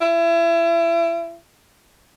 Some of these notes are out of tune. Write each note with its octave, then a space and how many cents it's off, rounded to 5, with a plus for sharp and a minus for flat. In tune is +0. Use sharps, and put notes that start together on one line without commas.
E4 +30